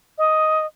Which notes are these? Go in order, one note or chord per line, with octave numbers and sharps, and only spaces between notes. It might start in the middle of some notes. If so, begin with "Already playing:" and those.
D#5